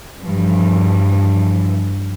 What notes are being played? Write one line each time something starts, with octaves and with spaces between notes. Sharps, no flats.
G2 E3 F3